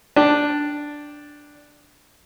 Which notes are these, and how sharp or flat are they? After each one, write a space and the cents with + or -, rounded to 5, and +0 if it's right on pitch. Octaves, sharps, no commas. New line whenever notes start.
D4 +0 D5 +0 G5 -5